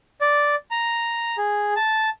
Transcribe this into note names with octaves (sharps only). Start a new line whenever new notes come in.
D5
A#5
G#4
A5